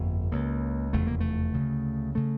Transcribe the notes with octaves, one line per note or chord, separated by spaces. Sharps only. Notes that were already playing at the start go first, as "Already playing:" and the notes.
Already playing: G1 F2 C#3 A#3
C#2 C#3 A#3
F1 E2 C#3 A3
A#3
A3
D2 C#3
C#3 A3